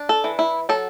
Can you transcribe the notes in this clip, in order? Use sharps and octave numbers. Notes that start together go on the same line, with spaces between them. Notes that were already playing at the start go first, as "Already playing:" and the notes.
Already playing: D4
A4
E3
E4
F#3 A4